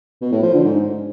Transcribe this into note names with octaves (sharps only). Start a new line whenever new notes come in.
B2
A2
F3
D3
G#2